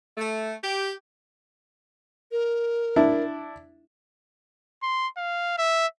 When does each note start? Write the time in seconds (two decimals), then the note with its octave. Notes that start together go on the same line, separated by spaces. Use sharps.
0.17 A3
0.63 G4
2.32 A#4
2.96 D4 E4
4.83 C6
5.17 F5
5.58 E5